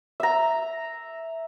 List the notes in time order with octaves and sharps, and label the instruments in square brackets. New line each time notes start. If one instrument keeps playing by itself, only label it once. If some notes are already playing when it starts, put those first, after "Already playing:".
[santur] E5 A#5